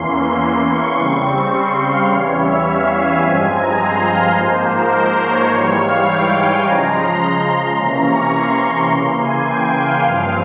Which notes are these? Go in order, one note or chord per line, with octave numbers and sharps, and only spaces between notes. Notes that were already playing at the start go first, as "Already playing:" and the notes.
Already playing: E2 E3 A#3 C#4 C6
C6
C#6
C#3 G3 C4
C6
F5
E2 E3 G3 C#4 C#5
E5
F5
G#5
G2 F3 G#3 C4
A#5
C6
F5
G#2 F3 A#3 C5
A#4
C5
C#5
G#2 E3 G3 C#5
F5
G5
G#5
C#3 F3 G#3 A#5
C6
C6
C6
C3 E3 A#3 C#4 A#5
C#6
C6
C#3 E3 A#3
G#5
G5
F5
G2 F3 C4